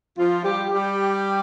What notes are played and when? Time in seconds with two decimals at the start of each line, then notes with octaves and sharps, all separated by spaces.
0.17 F3 F4
0.43 G3 G4
0.70 G3 G4